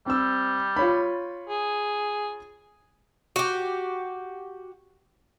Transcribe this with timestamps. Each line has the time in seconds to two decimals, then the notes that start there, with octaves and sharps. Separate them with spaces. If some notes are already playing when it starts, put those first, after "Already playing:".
0.06 G3 C4 E6
0.76 F4 C#5 B5
1.49 G#4
3.36 F#4 G4